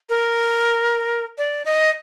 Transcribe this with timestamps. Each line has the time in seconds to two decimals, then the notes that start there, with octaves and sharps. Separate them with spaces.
0.09 A#4
1.38 D5
1.65 D#5